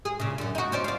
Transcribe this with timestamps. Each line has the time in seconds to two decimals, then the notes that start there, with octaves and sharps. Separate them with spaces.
0.05 G#4
0.20 A#2 C#3
0.38 F#2 D3
0.55 D#4 F#4
0.72 C#4 C5 D5
0.84 F4 D5